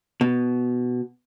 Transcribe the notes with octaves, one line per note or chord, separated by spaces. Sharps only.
B2